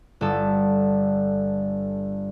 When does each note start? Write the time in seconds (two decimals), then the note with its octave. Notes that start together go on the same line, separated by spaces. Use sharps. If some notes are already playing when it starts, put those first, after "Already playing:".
0.21 G1 A4